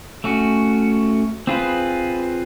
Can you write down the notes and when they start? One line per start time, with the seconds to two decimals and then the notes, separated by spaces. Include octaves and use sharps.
0.24 A3 C#4 F#4
1.47 C4 F4 G#4 B4